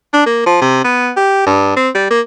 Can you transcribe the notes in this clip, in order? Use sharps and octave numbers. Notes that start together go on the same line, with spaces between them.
D4
A#3
F3
C3
B3
G4
G2
C4
G3
A#3